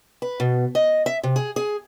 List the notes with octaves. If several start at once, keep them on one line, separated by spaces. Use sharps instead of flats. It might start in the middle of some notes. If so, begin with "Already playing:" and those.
B4
B2
D#5
E5
C3
G#4
G#4